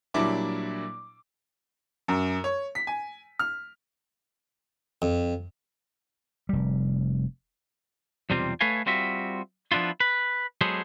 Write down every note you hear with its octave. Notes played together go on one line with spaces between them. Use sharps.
A#2 F#3 G3 D4 E4 D6
F#2
C#5
B6
G#5
F6
F2
F1 G3
B1 E2 C3 G3 C4 F4
A3 A4 B4 C#5 F5 G#5
G3 C4 F4 F#4 E5
F3 B3 D4 E4 F4
B4
F#3 G#3 B3 G#4 A4 C5